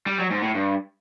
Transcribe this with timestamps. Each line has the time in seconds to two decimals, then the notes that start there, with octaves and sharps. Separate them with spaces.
0.07 G3
0.19 F#3
0.31 G#2
0.43 A2
0.55 G2